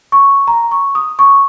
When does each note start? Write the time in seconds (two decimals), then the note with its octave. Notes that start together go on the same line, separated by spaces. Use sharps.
0.12 C#6
0.48 A#5
0.71 C#6
0.95 D#6
1.19 C#6